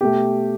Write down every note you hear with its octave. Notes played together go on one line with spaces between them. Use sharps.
B2 A3 G4